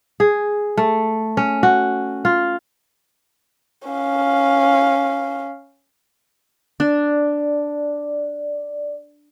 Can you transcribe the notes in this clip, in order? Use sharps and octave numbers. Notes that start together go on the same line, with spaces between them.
G#4
A3
C#4
F#4
F4
C#4 F5
D4 D5